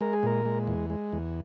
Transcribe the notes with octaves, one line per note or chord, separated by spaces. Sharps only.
G#3 A#4
G#4
A#2 A#4
G#3
E2
G#3
E2